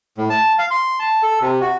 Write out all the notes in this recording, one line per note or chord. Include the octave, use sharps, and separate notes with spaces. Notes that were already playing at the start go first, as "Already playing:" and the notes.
A2
A5
F5
C6
A5
A4
C3
F#4